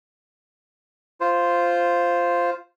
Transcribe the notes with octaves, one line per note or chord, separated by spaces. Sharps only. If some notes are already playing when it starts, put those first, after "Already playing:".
F4 C5